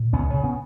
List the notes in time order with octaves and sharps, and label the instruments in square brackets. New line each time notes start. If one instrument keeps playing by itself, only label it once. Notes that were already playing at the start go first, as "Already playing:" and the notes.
Already playing: [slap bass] A#2
C#2 B3 C#4
C#3
B3 C#4